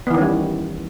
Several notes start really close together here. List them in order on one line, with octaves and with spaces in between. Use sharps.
B3 E3 D#3 C#4 G3